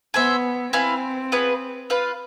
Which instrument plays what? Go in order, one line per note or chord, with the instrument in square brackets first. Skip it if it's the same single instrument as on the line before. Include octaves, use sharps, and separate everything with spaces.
[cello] B3 [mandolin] G#4 C5 E5
[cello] C4 [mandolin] E4 B4 F5 G#5
[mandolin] B3 F4 G#4 B4
F4 B4 F5